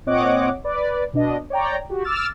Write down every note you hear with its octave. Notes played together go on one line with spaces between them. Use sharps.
A#2 C4 C#5 D#5 F#5 D6
B4 D5
B2 D4 D#5
C#5 D5 G5 A#5
F#4 G4
D6 E6 F6 A6 E7